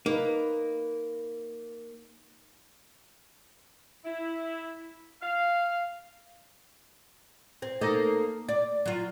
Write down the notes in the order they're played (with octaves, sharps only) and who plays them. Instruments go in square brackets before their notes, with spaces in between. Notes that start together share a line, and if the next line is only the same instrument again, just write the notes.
[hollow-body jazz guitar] A#3 [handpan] D#4 B4
[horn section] E4
F5
[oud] C4
A#3 D#4 A4
D5
F#3 F4